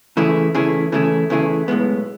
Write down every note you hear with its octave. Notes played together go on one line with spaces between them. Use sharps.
C#3 E3 A3 E4 G#4
C#3 E3 A3 E4 G#4
C#3 E3 A3 E4 G#4
C#3 E3 A3 E4 G#4
B1 A2 G#3 B3